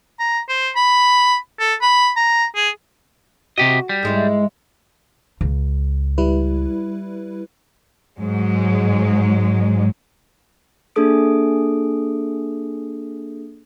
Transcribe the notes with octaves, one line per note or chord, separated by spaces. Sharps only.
A#5
C5
B5
A4
B5
A#5
G#4
C3 F#4 G4 D#5
G3
G#2 G#3 E4
C#2
G3 E4 B4
G#2 F#3 G#3
A#3 D4 G#4 A4 D#6 D7